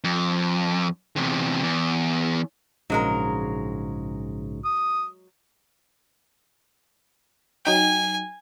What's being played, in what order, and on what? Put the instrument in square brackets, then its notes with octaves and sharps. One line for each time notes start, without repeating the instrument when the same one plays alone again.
[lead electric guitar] F2
E2 C3
E2
[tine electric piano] A#1 G#2 C#3 [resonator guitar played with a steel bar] F#3 G#3 A#4
[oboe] D#6
[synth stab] F#3 D#4 G5 [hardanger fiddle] G#5